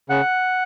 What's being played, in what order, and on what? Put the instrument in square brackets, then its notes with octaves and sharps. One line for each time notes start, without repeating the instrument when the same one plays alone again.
[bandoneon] C#3 F#5